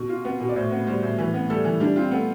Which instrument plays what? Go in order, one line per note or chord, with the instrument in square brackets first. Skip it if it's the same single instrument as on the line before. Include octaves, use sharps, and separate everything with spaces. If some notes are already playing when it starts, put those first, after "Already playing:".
Already playing: [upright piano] B2
F4
[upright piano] B3 [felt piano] B4
[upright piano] B2
[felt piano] D5
[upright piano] A2 [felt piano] C5
[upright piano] B3
[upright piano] G3 [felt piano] C5
[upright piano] A2
[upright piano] E3 [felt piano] B4
[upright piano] B3
[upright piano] G3 [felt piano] A4
[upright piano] E3
[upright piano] G3 [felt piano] D4
[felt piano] C4 [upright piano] F4
[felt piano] A3 [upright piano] B3